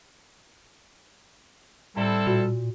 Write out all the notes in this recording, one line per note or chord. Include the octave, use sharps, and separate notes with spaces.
A2 G3 C4 E4 A4
A#2 F#4